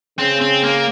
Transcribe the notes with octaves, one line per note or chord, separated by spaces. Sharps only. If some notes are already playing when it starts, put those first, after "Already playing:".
C#3 C4
C4
A#3